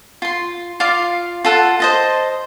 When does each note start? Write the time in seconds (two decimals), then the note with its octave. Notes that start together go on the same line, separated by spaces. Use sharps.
0.22 F4 C6
0.80 F4 D5 F5 D6
1.45 F4 A4 F#5
1.80 C5 D#5 A5